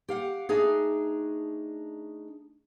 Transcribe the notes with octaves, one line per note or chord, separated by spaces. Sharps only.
G4 F5 F#5
A3 D4 D#4 G#4